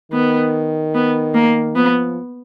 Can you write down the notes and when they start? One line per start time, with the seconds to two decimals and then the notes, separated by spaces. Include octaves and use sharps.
0.12 D#3 B3
0.94 B3
1.34 A#3
1.76 F3 B3